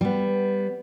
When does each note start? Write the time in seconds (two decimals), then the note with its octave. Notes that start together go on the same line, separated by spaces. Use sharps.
0.01 G3 B3